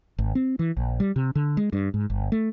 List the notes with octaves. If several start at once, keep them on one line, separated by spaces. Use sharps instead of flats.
G#1
C4
E3
A#1
G3
C3
D3
G#3
G2
G#2
G1
A3